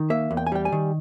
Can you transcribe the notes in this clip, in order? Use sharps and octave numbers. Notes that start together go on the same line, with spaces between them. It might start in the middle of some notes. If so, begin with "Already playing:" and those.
Already playing: D#3
A#3 E5
E2
G5
G#5
G3 G5
G#5
D#3